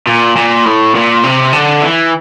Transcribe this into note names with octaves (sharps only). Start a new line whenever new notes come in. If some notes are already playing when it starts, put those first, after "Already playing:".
A#2
A#2
A2
A#2
C3
D3
E3